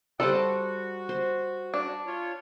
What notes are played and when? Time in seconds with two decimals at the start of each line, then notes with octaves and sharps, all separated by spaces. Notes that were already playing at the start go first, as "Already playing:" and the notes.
0.20 G3 A4 C5 G5 A5 D#6 F#6
0.33 F#4
1.09 C5
1.74 D4
2.06 F4 C#5